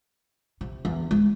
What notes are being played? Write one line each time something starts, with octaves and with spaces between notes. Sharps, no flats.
C3
E2
G#3